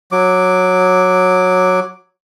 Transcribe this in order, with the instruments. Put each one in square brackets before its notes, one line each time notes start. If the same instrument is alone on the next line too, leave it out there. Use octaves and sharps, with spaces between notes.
[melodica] F#3 D6